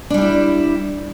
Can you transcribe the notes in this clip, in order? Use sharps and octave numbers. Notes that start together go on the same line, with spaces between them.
G3 D4 E4 G4